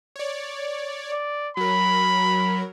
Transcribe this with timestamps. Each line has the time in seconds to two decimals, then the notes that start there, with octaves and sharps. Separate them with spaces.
0.16 C#5 D5
1.13 D5
1.57 F#3 A#4 B5